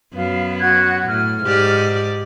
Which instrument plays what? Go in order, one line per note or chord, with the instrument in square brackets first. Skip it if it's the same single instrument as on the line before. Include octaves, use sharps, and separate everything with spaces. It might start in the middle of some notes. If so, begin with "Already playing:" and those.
[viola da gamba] F#2 F#3 B3 [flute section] F5
[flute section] F#4 F#6 G#6
[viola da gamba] A2 [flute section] F6
[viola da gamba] G#2 G4 D5